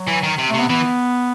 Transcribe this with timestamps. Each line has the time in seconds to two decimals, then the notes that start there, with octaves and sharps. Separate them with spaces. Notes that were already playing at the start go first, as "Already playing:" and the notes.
Already playing: F#3
0.08 E3
0.23 D#3
0.39 C3
0.50 C3 A3
0.59 B3
0.69 E3 B3